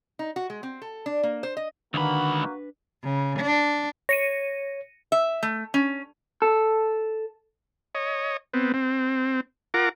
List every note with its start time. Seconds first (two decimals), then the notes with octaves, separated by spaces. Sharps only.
0.19 D#4
0.36 F#4
0.50 G#3
0.63 C4
0.82 A4
1.06 D4
1.23 A#3
1.43 C5
1.57 D#5
1.94 C#2 D3 D#3 A#3 D4 F#4 B4 B5
3.03 C#3
3.38 D4
4.09 C#5 A#6 C#7 D#7
5.12 E5
5.43 A3
5.74 C#4
6.42 A4
7.95 C#5 D#5
8.53 B3 C4
8.74 C4
9.74 F4 A#4 F#5 A#5 D6